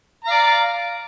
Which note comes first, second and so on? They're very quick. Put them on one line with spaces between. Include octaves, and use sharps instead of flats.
A#5 F5 D5